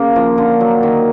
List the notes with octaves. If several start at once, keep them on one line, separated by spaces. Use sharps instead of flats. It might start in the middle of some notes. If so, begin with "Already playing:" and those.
Already playing: C#3 A#3
F3
D3
F#3
D#3